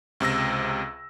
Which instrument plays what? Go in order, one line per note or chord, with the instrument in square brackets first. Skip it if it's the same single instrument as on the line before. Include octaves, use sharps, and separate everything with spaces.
[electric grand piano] C#2 C3 E6 A#6